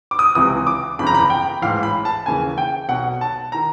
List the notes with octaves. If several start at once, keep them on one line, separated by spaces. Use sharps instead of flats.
D6
D#6
C#2 C3 E3 D#6
D6
G1 F2 C#3 E3 B5
A#5
B5
G5
A1 G#2 E3 F5
B5
A5
D#2 C#3 E3 G#5
G5
B1 B2 F#5
A5
D#3 A#5